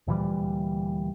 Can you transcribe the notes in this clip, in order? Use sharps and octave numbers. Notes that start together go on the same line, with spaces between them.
D2 A#2 E3 G3